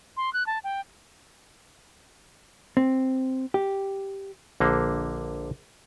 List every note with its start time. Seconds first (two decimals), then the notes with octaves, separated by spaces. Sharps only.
0.17 C6
0.33 F#6
0.46 A5
0.64 G5
2.77 C4
3.54 G4
4.60 A#1 D3 A#3